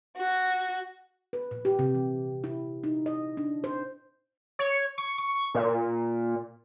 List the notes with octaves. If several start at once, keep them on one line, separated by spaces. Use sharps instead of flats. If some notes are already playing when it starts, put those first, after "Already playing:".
F#4
B4
A#2
G4
C3
E3
E4
D#4
D#5
D4
C5
C#5
C#6
C#6
A#2